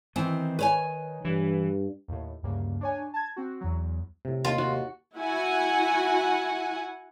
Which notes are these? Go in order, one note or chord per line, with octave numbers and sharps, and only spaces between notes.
D#3 E3 C4
B4 C#5 G#5
G2 E3
D#2 A2
D2 G2 C#3 A#3
D4 C#5 G#5
A5 G#6
C4 F#4
E2 F#3
A2 C3
D#2 F4
D#2 F#4
E4 F#4 F#5 G#5